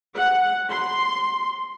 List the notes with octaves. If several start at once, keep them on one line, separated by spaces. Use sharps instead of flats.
F#5
C6